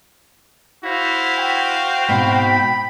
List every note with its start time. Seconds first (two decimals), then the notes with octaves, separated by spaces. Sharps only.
0.84 E4 F#4 C5 F5
1.39 G5
2.09 G#2 B2 C4 B5